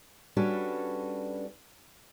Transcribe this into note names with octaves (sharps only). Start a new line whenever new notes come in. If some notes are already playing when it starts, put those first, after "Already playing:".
G3 C#4 D4 F#4 A4 B4